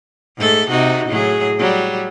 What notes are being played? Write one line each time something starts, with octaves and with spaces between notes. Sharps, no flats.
G#2 A3 A4
C3 D#4 F#4
A2 F#3 G#4
F#3 G3